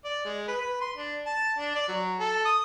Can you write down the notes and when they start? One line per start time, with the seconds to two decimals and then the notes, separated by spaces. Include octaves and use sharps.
0.05 D5
0.25 G#3
0.48 B4
0.60 B4
0.81 C6
0.97 D4
1.26 A5
1.58 D4
1.75 D5
1.89 F#3
2.20 A4
2.45 D#6